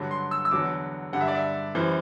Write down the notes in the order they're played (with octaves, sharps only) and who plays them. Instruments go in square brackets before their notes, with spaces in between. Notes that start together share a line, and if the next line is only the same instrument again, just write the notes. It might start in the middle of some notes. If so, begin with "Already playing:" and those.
Already playing: [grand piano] G2 D3 F#3
C6
E6
E6
E2 D3 F#3 D6
G2 D3 G3 F#5
E5
D5
E5
F#2 E3 G3 C5